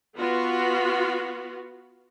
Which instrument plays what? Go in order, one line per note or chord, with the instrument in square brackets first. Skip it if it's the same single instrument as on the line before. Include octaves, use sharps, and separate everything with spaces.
[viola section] B3 F4 F#4